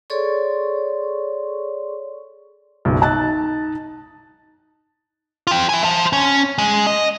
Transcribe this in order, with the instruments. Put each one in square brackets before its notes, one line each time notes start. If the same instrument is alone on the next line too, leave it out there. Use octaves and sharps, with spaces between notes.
[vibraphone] G#4 A4 C#5 D5 C6 C#6
[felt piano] F#1 B1
D#4 D#5 A5 F#6 A6
[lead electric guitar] F4 G5
E5 G#5
C5 A5
C#4
G#3
D#5